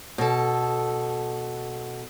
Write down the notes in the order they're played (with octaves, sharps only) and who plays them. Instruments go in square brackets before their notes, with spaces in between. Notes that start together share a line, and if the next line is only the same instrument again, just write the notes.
[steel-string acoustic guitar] B2 A4